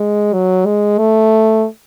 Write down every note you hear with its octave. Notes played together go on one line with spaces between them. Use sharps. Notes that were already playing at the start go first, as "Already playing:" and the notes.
Already playing: G#3
F#3
G#3
A3